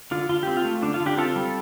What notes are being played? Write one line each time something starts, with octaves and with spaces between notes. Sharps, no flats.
D3 F4
D3 F4
C4 G4
F4
A3
D3 D4
F4
D3
D4 G4
C4 F4 A4
G3